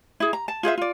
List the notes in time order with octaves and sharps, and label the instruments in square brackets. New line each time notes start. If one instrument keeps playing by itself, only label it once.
[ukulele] E4 G#4
A#5
A5
F4 G#4 C5 E5
F4 D5